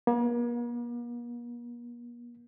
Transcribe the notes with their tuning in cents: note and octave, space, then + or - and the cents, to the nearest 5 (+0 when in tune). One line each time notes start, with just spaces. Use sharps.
A#3 +45